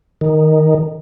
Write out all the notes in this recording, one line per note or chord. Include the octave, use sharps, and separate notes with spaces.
D#3